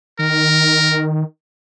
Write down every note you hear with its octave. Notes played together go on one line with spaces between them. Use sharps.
D#3 A#4